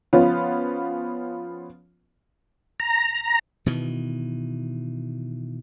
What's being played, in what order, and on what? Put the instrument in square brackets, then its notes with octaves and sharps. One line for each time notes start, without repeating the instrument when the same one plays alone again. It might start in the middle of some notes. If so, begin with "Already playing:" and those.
[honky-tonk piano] F3 B3 C#4 F4
[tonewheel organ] A#5
[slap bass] B2 D#3 E3